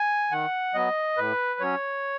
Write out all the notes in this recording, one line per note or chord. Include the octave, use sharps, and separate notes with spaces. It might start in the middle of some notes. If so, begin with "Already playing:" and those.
Already playing: G#5
D#3 F#5
F#3 B3 D#5
A2 B4
F#3 C#4 C#5